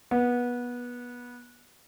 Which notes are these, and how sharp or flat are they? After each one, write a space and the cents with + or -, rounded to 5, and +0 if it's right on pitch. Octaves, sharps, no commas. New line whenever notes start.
B3 -20